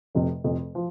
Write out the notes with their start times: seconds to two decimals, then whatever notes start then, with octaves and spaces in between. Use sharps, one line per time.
0.15 F1 F2 C3
0.44 F1 F2 C3
0.75 F3